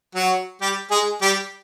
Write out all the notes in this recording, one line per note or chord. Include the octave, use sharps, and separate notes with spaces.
F#3 F#4
G3 G4
G#3 G#4
G3 G4